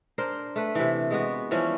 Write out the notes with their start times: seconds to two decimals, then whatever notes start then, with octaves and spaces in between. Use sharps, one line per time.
0.18 D4 A#4 C5
0.56 A3 B4
0.75 C3 E3
1.11 G#3 B3 F#4
1.51 E3 F3 G3 C#4